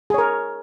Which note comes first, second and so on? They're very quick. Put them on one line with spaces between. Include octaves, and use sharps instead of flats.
G#4 C#5 A#4